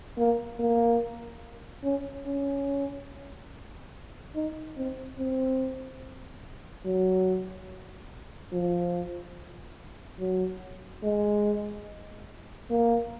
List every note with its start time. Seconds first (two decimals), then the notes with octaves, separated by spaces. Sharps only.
0.17 A#3
0.59 A#3
1.84 C#4
2.26 C#4
4.35 D#4
4.77 C4
5.19 C4
6.85 F#3
8.52 F3
10.19 F#3
11.03 G#3
12.70 A#3